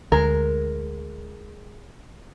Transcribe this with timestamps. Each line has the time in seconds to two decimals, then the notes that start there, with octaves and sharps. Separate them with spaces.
0.12 D2 G#3 A#4